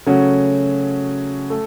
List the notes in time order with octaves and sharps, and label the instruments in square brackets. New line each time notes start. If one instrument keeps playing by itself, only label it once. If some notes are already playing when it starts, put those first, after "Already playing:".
[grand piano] C#3 F#3 A3 C#4 F#4
A3 A4